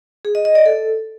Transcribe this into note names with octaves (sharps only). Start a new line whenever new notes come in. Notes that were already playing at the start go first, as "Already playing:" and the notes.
G#4
D#5
D#5
D5
A4